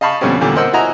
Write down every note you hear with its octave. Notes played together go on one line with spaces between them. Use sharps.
D#5 F5 A5 B5 C#6
F2 B2 D3 G3 C4 C#4
E2 A#2 D3 G3
A#4 C5 D#5 F#5 E6
E4 F#4 D#5 G#5 A#5